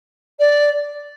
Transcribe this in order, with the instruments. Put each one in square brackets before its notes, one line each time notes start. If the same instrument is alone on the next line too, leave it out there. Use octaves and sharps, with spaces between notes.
[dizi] D5